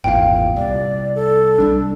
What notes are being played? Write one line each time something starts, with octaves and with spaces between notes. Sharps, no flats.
G#1 E2 A#2 F5 G5
C2 D5
A4
C2 G3 D4